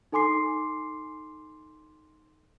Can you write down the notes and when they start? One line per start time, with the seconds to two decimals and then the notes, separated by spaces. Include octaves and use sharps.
0.12 D#4 A4 G#5 C6 D6 C7